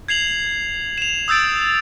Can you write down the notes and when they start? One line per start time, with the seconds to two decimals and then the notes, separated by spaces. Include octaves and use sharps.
0.08 G#6 C7 F7 F#7
0.98 E7 F7
1.28 D#6 E6 G6 A6 D7